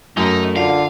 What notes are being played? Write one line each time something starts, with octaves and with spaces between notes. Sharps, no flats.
F#2 A3 D#4
D3 F4 F5